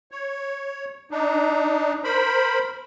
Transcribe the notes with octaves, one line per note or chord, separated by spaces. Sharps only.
C#5
D4 D#4
A#4 C5 B5